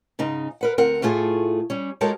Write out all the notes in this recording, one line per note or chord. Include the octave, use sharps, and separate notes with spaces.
G#2 C#3 D#4
A#4 B4 F#5
D2 C4 A#4 F#5
A2 A3 F4 G#4
G3 C#4
G#3 F#4 G4 A4 A#4 C#5